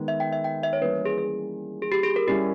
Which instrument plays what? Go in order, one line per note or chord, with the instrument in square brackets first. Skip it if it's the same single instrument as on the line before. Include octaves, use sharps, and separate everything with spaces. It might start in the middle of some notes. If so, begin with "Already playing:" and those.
Already playing: [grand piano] D#3 G#3 B3 D#4
[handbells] E5
G5
E5
G5
E5
C#5
[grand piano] E3 G3 A#3 C#4 [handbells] B4
[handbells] G#4
G#4
G#4
G4
G#4
A#4
[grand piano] G3 C#4 E4 [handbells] G4